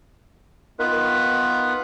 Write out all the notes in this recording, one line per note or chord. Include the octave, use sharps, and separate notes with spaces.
D#3 B3 F4 B4